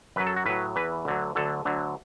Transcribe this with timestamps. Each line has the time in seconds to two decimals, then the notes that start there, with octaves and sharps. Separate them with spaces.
0.16 F#2 B4
0.20 F#3
0.27 A4
0.36 F#4
0.46 A2 F#3 B4
0.76 E2 E3 B4
1.05 D2 D3 F#3
1.35 D2 D3 F#3 A4
1.65 D2 D3 F#3